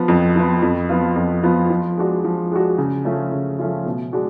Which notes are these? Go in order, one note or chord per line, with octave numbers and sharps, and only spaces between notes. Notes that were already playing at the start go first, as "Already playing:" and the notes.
Already playing: F3 B3
F2
F3 B3
F2
F3 B3 F4
F2
F3 B3 F4
F3
G#3 D4 F#4
F3
G#3 D4 F#4
C#3
F3 A3 C#4 F4
C#3
F3 A3 C#4 F4
B2
G#3 D4 F#4